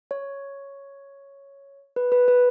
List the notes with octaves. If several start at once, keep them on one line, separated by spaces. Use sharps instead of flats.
C#5
B4
B4
B4